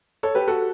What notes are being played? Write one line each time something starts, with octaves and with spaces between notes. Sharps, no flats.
A4 C#5
G4 B4
F#4 A4